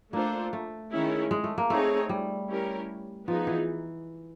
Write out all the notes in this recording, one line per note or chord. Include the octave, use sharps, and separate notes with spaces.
A3 A#3 D4 F4 A4 C5
A3
D#3 G#3 C#4 E4
G#3
A3
A#3
A3 C4 D#4 G#4 C#5
G3
C#4 E4 G4 A#4
F3 B3 D#4 G#4
E3